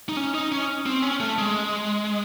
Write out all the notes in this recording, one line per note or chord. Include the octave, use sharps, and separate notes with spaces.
D#4
C#4
D#4
C#4
C4
C#4
A3
G#3